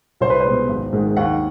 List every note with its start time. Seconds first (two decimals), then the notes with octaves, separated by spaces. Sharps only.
0.21 C2 C5
0.30 B4
0.40 C5
0.46 B2 G#3
0.69 G#1
0.92 G#2 D#3 G#3
1.17 D#2 F#5